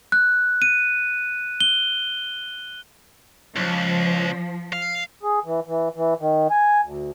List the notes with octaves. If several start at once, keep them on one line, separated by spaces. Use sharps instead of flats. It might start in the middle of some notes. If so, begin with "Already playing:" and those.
F#6
D#7
G7
C#2 F3
F5
G#4
E3
E3
E3
D#3
G#5
D2